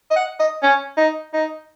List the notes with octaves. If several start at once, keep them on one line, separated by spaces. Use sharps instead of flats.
D#5
F#5
D#5
C#4
D#4
D#4